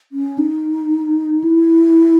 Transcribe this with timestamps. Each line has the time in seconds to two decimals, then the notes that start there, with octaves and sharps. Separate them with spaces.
0.12 C#4
0.38 D#4
1.44 E4